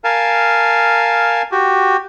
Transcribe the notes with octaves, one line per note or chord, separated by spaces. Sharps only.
A#4 F5 G#5 A5
F#4 G4